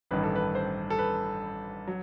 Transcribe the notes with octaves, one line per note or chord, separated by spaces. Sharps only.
A1 G2 D#3 B4
A4
B4
C5
A4
B4
F#3